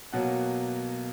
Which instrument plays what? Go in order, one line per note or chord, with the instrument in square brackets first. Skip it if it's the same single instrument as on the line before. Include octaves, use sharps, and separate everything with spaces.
[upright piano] B2 F#3 A#3 F#5